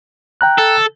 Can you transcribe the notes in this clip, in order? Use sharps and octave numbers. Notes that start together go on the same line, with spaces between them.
G5 A#5 F#6
A4